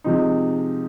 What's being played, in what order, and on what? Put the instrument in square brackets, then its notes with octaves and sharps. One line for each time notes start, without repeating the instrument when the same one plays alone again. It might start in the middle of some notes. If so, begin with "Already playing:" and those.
[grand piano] C3 F3 G#3 D#4